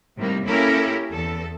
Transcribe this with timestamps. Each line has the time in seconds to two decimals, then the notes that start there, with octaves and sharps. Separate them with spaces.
0.17 A2 C3 D#3 G3 A#3
0.46 A#3 C#4 E4 G4 A4 A#4
1.12 E2 A4